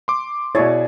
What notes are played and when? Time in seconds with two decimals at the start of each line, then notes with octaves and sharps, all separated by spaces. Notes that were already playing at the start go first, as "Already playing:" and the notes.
0.08 C6 D6
0.55 B2 E4 G#4 C#5 D5 A6